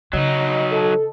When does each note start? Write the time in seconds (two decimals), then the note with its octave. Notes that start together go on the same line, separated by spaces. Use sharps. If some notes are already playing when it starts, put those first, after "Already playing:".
0.13 C#3 F#3 D#4 D#5
0.72 A4